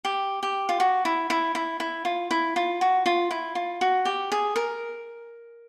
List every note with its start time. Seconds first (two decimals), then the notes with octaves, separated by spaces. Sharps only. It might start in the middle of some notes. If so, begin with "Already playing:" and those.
0.05 G4
0.43 G4
0.69 F4
0.80 F#4
1.05 E4
1.30 E4
1.55 E4
1.80 E4
2.05 F4
2.31 E4
2.56 F4
2.81 F#4
3.06 F4
3.31 E4
3.55 F4
3.81 F#4
4.05 G4
4.32 G#4
4.56 A#4